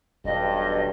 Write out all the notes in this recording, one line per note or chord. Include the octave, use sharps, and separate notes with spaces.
E1 B1 G2 D#5